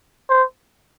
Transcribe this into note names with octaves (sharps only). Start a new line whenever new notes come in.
C5